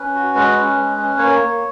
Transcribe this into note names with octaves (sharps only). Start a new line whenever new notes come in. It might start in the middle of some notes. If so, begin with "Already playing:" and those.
Already playing: C#4 B4
F#4
G#3 B4
C#4
G#3
C#4
A#3 C#5
A#3